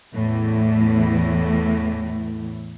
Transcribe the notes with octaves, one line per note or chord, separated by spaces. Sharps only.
E2 A2 E3